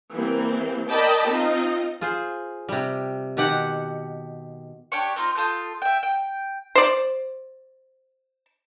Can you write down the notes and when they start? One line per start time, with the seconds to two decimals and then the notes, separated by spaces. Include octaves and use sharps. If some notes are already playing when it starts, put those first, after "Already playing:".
0.13 E3 G3 A#3 C4
0.89 A#4 D5 D#5 G5 A5 B5
1.29 C4 D#4 F4 D#5
2.01 F4 G#4 C5
2.69 C3 G3
3.37 B2 D#3 G4 F#5
4.92 D4 G4 C#5 C#6
5.16 C4 D#4 F4 A#5
5.35 F4 A4 D#6 G6
5.82 E5 G5
6.03 G5
6.75 C5 D5